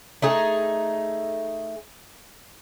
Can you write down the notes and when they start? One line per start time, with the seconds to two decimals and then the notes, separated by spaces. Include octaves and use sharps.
0.22 A3 D#4 G#4